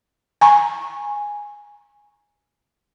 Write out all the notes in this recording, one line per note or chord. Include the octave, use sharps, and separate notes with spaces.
G#5 A#5 C#6